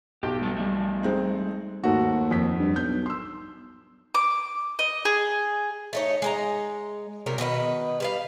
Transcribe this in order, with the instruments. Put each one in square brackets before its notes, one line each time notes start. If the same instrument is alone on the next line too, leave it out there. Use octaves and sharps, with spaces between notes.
[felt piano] B1 [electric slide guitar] G4
[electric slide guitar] G3 B3 A4
G3 A3
[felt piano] G#3 C4 D#4
[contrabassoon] D#2 [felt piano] G#2 A3 F#4
[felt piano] F2 B6
[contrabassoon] G2
[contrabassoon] B1 [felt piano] G6
[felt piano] C6 E6
[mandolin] D6
D#5
G#4
[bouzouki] A3 D#4 C#5
G#3 D#5 A#5
C3 F#3 G3 A#4
B2 D#3 B4 D#5
G3 B4 F5